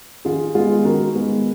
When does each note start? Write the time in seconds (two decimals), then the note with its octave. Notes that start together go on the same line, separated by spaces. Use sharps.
0.25 D#3 F4 G#4
0.55 G#3 B3 F4 G#4
0.85 D#3 F#4 A#4
1.15 G#3 B3